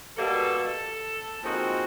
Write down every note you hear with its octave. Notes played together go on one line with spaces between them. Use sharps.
B2 G3 A#3 A4
A#2 F3 G#3 C4 D#4 F#4